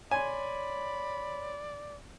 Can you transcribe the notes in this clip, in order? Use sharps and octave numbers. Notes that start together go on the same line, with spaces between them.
C#5 D5 G#5 B5 C6